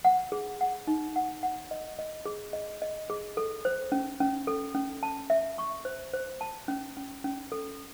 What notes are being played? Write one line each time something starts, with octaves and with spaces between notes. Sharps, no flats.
F#5
G#4
F#5
D#4
F#5
F#5
D#5
D#5
G#4
D#5
D#5
G#4
A4
C5
C#4
C#4
A4
C#4
A5
E5
C#6
C5
C5
A5
C#4
C#4
C#4
A4